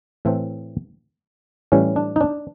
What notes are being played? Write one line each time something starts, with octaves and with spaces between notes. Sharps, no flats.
A2 E3 A3 C4
A2 E3 G3 C#4
D4
D#4
D4